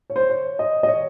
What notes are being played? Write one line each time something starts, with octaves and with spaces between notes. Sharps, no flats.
C#5
C5
C#5
D#5
D#5
C#5